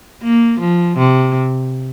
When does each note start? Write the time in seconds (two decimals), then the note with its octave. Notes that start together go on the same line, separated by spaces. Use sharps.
0.23 A#3
0.60 F3
0.98 C3